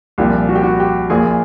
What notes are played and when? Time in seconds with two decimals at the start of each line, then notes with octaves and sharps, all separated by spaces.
0.18 C2 A#2 F3 G4
0.49 F#4
0.55 G4
0.63 F#4
0.80 G4
1.10 A#1 A#2 F3 G#4